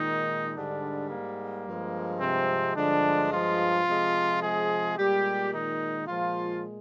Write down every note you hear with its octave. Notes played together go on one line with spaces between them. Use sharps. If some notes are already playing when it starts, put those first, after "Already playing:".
Already playing: A#2 D#3 G#3 D#4
G#2 D3 G3 D4
A#3
G2 F3 G#3
C3 C4
G2 D3 F3 G#3 D4
F3 F4
C3 F3 G#3
G#3 G#4
A#2 G3 G#3 G4
D#3 D#4
A#2 F3 G#3 F4